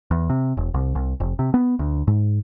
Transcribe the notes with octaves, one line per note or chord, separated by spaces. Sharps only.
E2
C3
E1
C2
C2
F1
C3
B3
D2
G#2